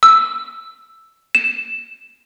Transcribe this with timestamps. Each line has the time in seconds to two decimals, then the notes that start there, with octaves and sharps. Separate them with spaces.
0.03 E6
1.35 E7